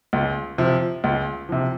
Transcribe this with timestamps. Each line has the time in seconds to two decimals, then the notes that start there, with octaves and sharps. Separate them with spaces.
0.13 C#2
0.58 C3 F3
1.04 C#2
1.49 C3 F3